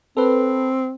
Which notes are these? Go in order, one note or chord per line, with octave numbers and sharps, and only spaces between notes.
C4 A4 B4